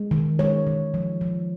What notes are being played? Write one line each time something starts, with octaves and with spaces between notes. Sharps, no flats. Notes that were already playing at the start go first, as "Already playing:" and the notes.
Already playing: G#3
D#3
G#3 C#5
D#3
F3
F3